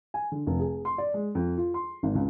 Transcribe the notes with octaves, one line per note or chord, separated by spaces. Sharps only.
G#5
D3
F1
G#4
C6
D5
G#3
F2
F4
C6
G#1
C#2